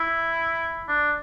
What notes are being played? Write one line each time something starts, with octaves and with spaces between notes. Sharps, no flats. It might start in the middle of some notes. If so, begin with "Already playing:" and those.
Already playing: E4
D4